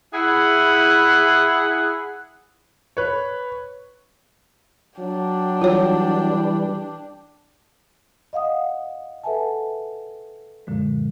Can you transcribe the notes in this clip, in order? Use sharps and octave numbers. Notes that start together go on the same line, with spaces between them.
E4 G#4 F#5
B4 C#5
F#3 D4 G5
E3 G3 F4 C#5
D#5 F5 F#5 D#6
A4 B4 E5 F#5 G#5 A5
F#2 A#2 D3 F3 G#3